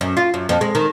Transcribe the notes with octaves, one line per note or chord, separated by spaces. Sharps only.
F#2
F4
F#2
F2
G#3
D#3